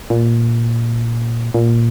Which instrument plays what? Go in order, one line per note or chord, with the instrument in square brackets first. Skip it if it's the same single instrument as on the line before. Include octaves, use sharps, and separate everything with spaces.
[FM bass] A#2
A#2